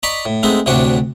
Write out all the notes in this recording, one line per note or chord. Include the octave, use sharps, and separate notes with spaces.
D5 D#5 A#5 B5 C#6
A2
G#3 A3 B3 C4 D#4
D2 A2 C3 D4 F#4 F#5